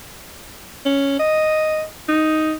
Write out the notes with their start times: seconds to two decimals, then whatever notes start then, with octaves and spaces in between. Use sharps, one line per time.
0.85 C#4
1.20 D#5
2.09 D#4